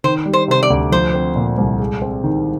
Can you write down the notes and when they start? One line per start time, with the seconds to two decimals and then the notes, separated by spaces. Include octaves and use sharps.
0.04 D#3 C5
0.26 G3
0.33 C5
0.48 C3 C5
0.63 D5
0.70 D2
0.92 F3 C5
1.14 C4
1.36 A#2
1.58 C2
1.80 G#3
2.02 C4
2.24 D#3